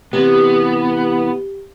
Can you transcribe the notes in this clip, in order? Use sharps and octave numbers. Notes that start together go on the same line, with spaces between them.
C3 E3 B3 G4